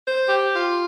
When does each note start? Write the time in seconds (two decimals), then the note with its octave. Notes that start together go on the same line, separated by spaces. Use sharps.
0.04 C5
0.28 G4
0.53 F4